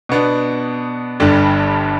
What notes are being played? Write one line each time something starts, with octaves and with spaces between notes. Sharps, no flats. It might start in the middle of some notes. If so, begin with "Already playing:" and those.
B2 B3 D4
G1 G2 D3 G3 D4